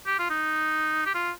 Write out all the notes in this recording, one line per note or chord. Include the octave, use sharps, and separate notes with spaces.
G4
F4
D#4
G4
F4